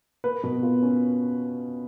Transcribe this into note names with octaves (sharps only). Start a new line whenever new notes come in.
A#3 B4
B2
F4
C#4